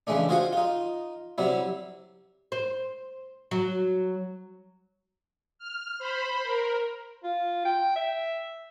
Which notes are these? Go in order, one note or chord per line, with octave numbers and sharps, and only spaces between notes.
C#3 E3 G#3 A3 D4
F4 F#4 G#4 C5 F5 F#5
D#4 F4
C3 F#3 G3 E4
C5
F#3
F6
C5 B5
A#4
F4
G5
E5